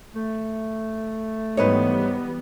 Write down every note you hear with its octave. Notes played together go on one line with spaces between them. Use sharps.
A3
D#2 G#2 E3 G3 B3 D#4 B4 C#5